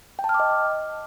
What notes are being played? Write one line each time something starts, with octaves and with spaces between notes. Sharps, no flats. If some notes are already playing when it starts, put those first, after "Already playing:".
G5
A5
F6
D6
D#5